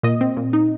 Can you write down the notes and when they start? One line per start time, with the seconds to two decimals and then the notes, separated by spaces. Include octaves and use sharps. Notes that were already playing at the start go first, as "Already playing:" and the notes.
0.03 A#2 D#5
0.21 C4
0.37 A#2
0.53 D#4